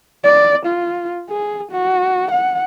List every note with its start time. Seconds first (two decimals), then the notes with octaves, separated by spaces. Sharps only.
0.24 D5
0.66 F4
1.30 G#4
1.72 F#4
2.31 F#5